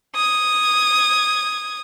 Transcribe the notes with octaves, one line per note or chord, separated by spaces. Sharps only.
D#6 G#6